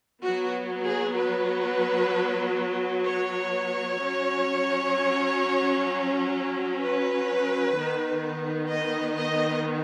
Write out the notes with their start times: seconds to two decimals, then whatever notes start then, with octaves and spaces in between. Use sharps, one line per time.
0.22 F#3 B3 F#4
0.86 G#4
1.16 B4
3.04 C#5
3.99 F#3 C#4
6.81 B4
7.75 D#3 B3
8.69 D#5
9.16 D#5